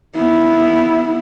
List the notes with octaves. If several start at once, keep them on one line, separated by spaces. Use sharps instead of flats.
B3 E4